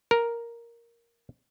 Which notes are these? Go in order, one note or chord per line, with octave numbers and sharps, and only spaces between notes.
A#4